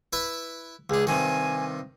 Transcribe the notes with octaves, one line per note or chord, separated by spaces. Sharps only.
E4 B4 E5
C#2 D4 G#4
G2 C3 D#3 G#5